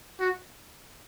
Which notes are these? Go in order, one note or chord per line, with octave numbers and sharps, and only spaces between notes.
F#4